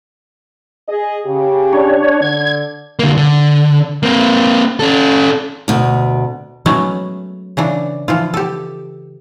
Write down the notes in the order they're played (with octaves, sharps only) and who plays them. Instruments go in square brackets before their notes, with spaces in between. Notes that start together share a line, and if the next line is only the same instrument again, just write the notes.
[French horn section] G#4 D#5
C#3 G4
[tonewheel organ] D4 C#5
[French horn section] D3 [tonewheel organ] G#6
[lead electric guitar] D3 A#3
D3
A#3 C4
C#4 A4
[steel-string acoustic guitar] D2 B2
[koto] F#3 G#3 A3 B3 C#4
C#3 E3 D4
E3 F3 F4
G4 A4